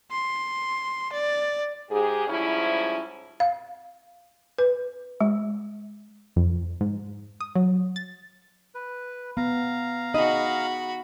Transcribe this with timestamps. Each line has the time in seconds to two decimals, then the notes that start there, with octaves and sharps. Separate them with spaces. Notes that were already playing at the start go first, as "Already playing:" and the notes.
0.11 C6
1.12 D5
1.91 G#2 G4 G#4
2.28 G#2 F3 G3 C#4 E4
3.40 F5
4.59 B4
5.21 G#3
6.36 F2
6.81 G#2
7.41 D#6
7.56 F#3
7.96 A6
8.75 B4
9.37 B3 F5 A#5
10.14 D#4 F#4 G#4 D#5 B5